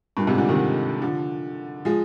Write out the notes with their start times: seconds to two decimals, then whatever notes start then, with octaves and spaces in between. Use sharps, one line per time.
0.17 G2 A#2
0.27 G#2 C3
0.38 A#2 D3
0.49 C3 D#3
1.01 D3 F3
1.85 F3 G#3